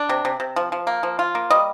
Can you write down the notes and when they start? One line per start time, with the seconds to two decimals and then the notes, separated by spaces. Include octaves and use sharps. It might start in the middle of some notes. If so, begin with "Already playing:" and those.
Already playing: D4
0.09 C3
0.25 C3
0.40 C3
0.56 F3
0.72 F3
0.87 A#3
1.03 F3
1.19 F4
1.35 A#3
1.50 G3 D#5